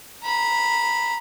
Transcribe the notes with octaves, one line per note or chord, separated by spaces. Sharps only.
A#5 B5